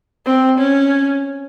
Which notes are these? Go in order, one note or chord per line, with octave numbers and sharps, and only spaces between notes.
C4
C#4